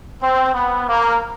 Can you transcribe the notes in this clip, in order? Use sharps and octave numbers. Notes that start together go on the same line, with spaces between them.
C4
B3
A#3